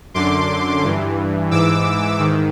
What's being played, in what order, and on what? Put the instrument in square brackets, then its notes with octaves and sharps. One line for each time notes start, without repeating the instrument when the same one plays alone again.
[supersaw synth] F#2 D3 C6 D6
G2 E3
G#2 E3 D6 E6
G#2 D#3